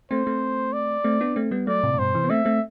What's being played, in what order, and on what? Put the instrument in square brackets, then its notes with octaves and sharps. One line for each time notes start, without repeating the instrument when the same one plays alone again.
[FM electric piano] A3 C4 [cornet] C5
[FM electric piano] A3 C4
[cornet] D5
[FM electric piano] A3 C4
B3 D4
A3 C4
G3 B3
[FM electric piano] F#3 A3 [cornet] D5
[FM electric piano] A2 C3
A2
[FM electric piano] G2 B2 [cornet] C5
[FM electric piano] C3 E3
B3
[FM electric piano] A3 C4 [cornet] E5
[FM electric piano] A3 C4